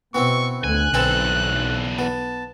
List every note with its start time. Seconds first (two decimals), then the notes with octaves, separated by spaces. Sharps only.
0.15 B2 B3 C4 E4 C#6
0.64 D2 D3 G#5 F#6
0.94 B1 E2 C4 A4 B4 G#5
1.99 B3 A5